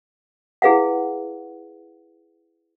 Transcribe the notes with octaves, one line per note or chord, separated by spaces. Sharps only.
E4 G#4 B4 F5 F#5